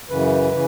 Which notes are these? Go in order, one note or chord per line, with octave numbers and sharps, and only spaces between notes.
F#2 C#3 E3 B4
C#3 E3